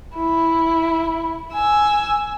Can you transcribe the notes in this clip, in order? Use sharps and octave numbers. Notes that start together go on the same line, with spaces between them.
E4
G#5 E6